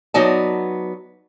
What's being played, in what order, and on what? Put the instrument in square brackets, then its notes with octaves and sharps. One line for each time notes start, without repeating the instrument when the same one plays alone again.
[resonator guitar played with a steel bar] F#3 B3 D#4 D5 A5